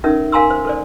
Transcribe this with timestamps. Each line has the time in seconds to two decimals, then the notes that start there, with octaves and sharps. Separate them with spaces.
0.04 C#4 D#4 A4 A#4 E5
0.32 A#4 F5 G#5 A#5 C6 E6
0.50 C5
0.65 A4 C5 D5